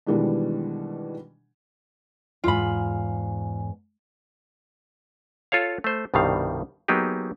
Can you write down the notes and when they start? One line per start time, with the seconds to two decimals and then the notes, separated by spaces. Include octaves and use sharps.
0.07 B2 D#3 E3 G3 G#3 D4
2.44 E2 G#2 F4 B5
5.52 F4 A4 C#5 F5
5.84 A3 C5
6.14 C2 G2 B2 D#3 G3 F5
6.88 F#3 A#3 B3 D#4 G4 G#4